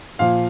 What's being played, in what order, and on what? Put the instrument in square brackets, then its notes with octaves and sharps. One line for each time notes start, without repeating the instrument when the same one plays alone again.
[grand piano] A#2 F3 F5